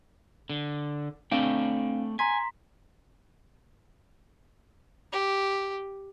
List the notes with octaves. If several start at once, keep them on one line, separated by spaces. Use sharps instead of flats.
D3
A3 C4 D4 D5 F5 G5
G#5 A#5 C6 B6
G4